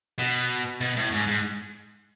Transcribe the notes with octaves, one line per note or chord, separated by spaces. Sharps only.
B2
B2
A2
G#2
G#2